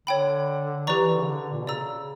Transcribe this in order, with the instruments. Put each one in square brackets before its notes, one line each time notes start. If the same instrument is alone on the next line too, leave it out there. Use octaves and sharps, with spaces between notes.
[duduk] D3 [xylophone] C#5 G5 B5
[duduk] E3 [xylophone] G4 B4 D5 A#5 C#6
[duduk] E3
D3
C#3
D3
A#2
B2
[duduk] C#3 [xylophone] D5 A#5 E6